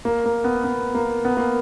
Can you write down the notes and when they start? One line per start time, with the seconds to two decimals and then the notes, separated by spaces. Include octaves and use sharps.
0.05 A#3
0.25 A#3
0.44 B3
0.64 B3
0.95 A#3
1.25 B3
1.37 A#3